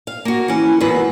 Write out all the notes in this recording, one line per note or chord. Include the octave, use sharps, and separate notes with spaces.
F5
A#3 F#4
E3 C#4
E2 G#2 F#3 A#3 B4 F#5